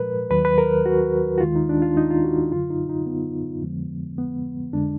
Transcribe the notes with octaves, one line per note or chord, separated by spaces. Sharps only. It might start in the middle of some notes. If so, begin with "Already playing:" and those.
Already playing: A#2 F3 G#3 A#4 B4
D#2 D#3 F#3 B4
B4
A#4
F#4
F#4
D#2 D#3 G#3 F4
D#4
D4
F4
D#4
F4
F#4
F#2 D3 F#3 F4
D#4
D#4
B3
F2 D3 F3 G#3
B3
F2 D3 G#3 D4